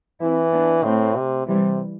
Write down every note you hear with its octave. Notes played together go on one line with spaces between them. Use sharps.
E3 C4 E4
B3 D4
A2 A3 C4
C3
C3 E3 G3